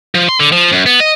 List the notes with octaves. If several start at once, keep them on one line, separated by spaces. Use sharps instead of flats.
F3
C6
D3
F3
F#2
B3
D#5